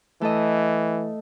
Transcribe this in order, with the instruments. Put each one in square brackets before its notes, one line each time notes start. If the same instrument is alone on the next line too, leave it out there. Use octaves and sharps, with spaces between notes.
[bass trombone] E3 [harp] A3 A4 D#5